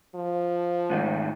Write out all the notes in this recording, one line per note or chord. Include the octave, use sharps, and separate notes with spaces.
F3
G#2 D#3 A3